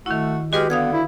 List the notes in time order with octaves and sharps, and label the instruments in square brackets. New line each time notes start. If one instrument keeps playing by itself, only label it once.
[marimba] D#3 E4 [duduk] A3 [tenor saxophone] F#4
[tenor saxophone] G#3 [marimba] F#4 B4 F6 [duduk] G4
[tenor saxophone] D3 [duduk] B3 [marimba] F5 D#6 G#6
[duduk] E4